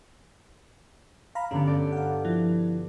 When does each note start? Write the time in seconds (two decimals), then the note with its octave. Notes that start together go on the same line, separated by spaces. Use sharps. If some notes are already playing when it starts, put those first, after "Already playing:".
1.35 F5 A#5 B5
1.51 G2 D3 B3 C#4
1.67 D5 G6
1.92 F5 F#5
2.25 F3 E4